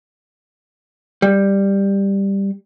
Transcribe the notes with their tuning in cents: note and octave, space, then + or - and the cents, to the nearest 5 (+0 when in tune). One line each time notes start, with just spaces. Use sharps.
G3 +10